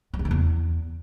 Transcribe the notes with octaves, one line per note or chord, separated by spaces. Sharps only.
F#3
C#3
D#3
E2